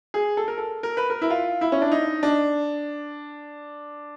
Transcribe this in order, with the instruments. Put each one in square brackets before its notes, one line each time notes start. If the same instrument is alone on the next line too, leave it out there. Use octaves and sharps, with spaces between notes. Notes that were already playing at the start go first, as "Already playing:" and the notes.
[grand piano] G#4
A4
A#4
A4
A#4
B4
A#4
E4
F4
E4
C#4
D4
D#4
D4